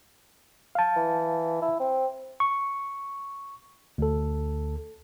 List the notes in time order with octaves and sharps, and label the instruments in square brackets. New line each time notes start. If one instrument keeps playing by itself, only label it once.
[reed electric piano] F5 A5
[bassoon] E3
E4
C4
[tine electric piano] C#6
D2 A4